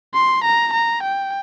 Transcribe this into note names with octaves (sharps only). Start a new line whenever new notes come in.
C6
A#5
A#5
G5